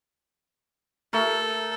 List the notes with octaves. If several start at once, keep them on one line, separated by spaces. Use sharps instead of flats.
A3 A4 A#4